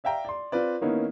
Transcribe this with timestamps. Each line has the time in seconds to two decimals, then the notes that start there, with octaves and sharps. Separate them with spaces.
0.04 D5 E5 F5 G5 A#5
0.25 D5 C6
0.52 C4 F4 B4 D5
0.81 D#3 A#3 B3 C#4 D#4 E4